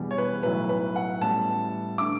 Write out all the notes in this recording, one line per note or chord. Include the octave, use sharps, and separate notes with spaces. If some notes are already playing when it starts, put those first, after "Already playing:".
Already playing: E1 E2 B2 G3
C#5
B4
B1 A2 F#3 B4
B4
F#5
A1 A2 G3 B3 A5
D3 A3 D6